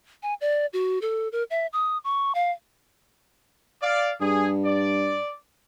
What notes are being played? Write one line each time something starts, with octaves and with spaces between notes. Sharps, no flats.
G#5
D5
F#4
A4
A#4
E5
D#6
C#6
F5
D5 F5
G2 G#4
D5